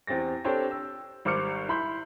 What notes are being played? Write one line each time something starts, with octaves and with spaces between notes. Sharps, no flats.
E2 C4 G4 A6 A#6
C4 D4 G4 A4 C5 C#5
E6
G#1 G3 C5 D6 F6 C#7
E4 B5 C6 G6